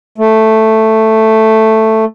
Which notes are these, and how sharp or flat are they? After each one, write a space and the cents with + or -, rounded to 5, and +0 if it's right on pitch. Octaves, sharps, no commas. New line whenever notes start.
A3 +5